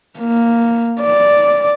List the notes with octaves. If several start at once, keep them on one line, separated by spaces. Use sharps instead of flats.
A#3
D5